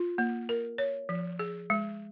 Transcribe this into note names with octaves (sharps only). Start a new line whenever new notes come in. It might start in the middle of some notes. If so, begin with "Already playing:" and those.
Already playing: F4
A#3
A#4
C#5
F3
G#4
G#3